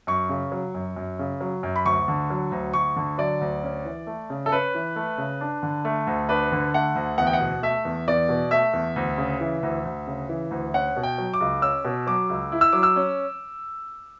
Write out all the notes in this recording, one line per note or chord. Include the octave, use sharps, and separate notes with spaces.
F#2 C#6
C#3
F#3
F#2
F#2
C#3
F#3
F#2
B5
D2 C#6
D3
F#3
D2
D2 C#6
D3
F#3 D5
D2
C#4
E3
A3
C#3
A4
C#4 B4
E3
A3
C#3
D4
D3
A3
D2
D4 B4
D3
A3 F#5
D2
E2 F#5
G5
F#5
B2
A3 E5
E2
E2 D5
B2
A3 E5
E2
D2
C#3
E3
D2
D2
C#3
E3
D2
C#4 F#5
B2
G5
F#3
D6
C#2
C#4 E6
B2
F#3 D6
C#2
E4
E6
F#3 D6
E6
C#4